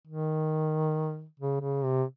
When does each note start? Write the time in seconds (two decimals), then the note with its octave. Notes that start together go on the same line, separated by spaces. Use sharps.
0.07 D#3
1.39 C#3
1.61 C#3
1.84 C3